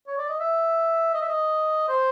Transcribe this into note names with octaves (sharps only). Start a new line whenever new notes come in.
C#5
D5
D#5
E5
D#5
E5
D#5
C5